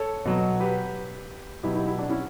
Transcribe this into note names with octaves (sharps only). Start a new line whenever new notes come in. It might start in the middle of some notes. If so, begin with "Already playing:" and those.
Already playing: A4 C#5
B2 F#3
G4 B4
B2 F#3 E4 G4
E4 G4
E4 G4
D4 F#4
C#4 E4